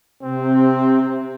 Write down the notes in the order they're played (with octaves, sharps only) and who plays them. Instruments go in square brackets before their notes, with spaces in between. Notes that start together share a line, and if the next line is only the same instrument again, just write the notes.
[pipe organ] C3 [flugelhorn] C4